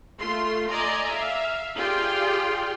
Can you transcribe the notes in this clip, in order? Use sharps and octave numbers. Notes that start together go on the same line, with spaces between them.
A3 F4 C6
D5 D#5 G#5 A#5
E5 F5
F4 G4 G#4 D5 G5 C6